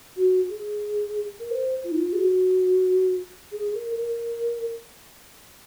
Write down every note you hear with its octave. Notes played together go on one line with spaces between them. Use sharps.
F#4
G#4
A#4
C5
F4
D#4
F4
G#4
F#4
G#4
A#4
A#4